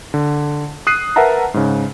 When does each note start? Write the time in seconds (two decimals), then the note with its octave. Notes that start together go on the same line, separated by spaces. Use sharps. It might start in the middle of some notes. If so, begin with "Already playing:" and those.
0.14 D3
0.87 D#6 F#6 C7 D#7
1.16 A#4 B4 E5 F#5 A5 A#5
1.54 G#2 C#3